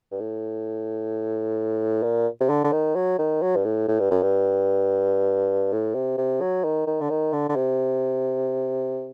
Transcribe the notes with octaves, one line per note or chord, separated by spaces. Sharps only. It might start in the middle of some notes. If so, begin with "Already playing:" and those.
G2
A2
A#2
C3
D3
D3
D#3
F#3
D#3
F#3
G2
A2
A2
G2
F#2
G2
A2
C3
C3
F#3
D#3
D#3
D3
D#3
D3
D3
C3